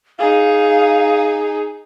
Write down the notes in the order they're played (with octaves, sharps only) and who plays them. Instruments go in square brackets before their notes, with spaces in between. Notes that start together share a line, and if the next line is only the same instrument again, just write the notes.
[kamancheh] D#4 G#4 [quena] F5